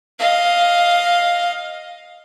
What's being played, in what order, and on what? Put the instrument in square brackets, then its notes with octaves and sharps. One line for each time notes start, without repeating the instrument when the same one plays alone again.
[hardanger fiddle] D#5 F5